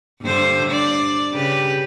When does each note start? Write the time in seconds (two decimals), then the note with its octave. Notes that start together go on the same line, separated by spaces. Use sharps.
0.22 G2 D3 C5
0.71 D5
1.33 C#3 G4 B4